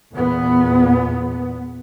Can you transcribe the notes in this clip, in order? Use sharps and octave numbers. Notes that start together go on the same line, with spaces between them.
E2 A#2 B3